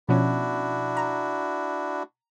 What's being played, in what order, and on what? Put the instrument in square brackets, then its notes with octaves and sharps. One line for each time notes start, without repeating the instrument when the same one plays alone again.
[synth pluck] B2 F3 C#4 [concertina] D4 E4 F#4
[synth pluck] A#5